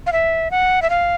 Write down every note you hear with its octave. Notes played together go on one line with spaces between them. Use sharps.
F5
E5
F#5
E5
F5